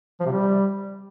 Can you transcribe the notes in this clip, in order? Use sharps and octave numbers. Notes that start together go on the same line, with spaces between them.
F3
C3
G3